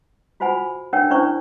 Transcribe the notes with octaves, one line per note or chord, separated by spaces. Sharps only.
F4 F#4 C5 F#5 G#5 B5
D4 A#4 C#5 F#5 G5
C#4 D4 E4 C5 D5 C#6